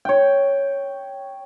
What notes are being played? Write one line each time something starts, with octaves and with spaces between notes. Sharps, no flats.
C#5 G5